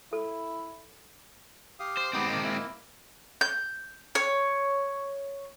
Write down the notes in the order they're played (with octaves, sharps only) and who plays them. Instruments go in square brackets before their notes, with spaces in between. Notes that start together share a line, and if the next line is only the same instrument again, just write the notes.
[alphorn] E4 [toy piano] A4
[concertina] G4 F5 D#6
[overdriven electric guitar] C5
[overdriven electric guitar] G#3 C4 [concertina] B3 D#4 G4
[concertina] A#3 D#4 D6
A#3 E4
[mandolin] G6
C#5